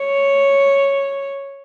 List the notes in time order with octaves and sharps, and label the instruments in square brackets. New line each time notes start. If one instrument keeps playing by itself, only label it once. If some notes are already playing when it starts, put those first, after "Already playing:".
Already playing: [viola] C#5